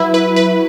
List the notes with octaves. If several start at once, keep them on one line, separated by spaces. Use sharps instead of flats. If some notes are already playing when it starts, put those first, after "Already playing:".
Already playing: F#3 E4 B4
B4
B4